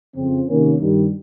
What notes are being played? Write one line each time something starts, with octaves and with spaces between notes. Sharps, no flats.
F2 C#3 F3 C4
C3 D#3 A#3 C#4
G2 D#3 G3